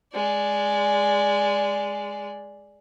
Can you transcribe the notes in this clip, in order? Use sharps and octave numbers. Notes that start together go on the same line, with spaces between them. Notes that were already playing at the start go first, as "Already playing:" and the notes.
G#3 D5